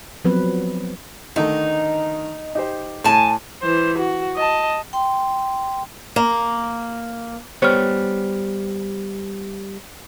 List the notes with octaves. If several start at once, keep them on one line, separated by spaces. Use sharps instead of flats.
F3 F#3 B3 C4 B4
D3 D#3 A3 D#4
D#4 G4 C5
A2 G#5 A5
E3 C5
F#4
D#5 A5
G5 C6
A#3
G3 B3 C5 C#5 F6